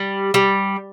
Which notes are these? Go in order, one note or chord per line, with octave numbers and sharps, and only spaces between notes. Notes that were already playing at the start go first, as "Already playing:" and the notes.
Already playing: G3
G3